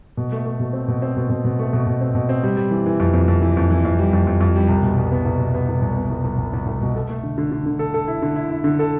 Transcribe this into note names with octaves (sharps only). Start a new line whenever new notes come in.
B2
A3
A3
B2
C4
B2
C4
B2
B2
B2
A3
B2
B2
C4
B2
C4
G3
G3
E3
E3
F2
F2
F2
E3
F2
E3
F2
G3
F2
F2
F2
G3
C2
B2
C2
B3
C2
B2
B3
C2
C2
B3
C2
C2
C2
C2
C2
B2
A4
A3
D3
D3
D3
D3
A4
A4
E4
D3
E4
E4
D3
A4